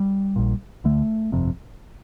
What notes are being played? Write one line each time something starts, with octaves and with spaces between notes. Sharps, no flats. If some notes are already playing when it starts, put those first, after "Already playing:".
Already playing: G3
A#1 A#2
D2 D3 A3
G1 F2 C3